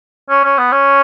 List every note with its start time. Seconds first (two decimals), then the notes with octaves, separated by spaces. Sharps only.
0.29 C#4
0.44 C#4
0.58 B3
0.72 C#4